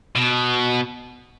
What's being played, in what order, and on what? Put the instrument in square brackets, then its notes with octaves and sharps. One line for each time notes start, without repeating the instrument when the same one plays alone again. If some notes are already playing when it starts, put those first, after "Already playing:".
[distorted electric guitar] B2